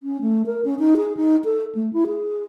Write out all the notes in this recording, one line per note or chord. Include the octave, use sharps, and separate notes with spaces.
C#4
A3
A#4
C#4
D#4
G#4
D#4
A4
A3
E4
G#4